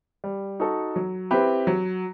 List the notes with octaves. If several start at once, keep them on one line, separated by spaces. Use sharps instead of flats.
G3
D#4 F#4 A4
F#3
C4 E4 G4 B4
F#3